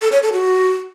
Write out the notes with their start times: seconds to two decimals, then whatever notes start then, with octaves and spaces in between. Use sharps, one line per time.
0.02 A4
0.12 C#5
0.22 A4
0.33 F#4